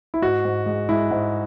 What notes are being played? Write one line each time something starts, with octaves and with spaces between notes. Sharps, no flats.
E4
G#2 F#4
G#2
G#3
G#3 E4
G#2